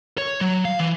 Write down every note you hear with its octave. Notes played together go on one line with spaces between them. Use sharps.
C#5
F#3
F5
E3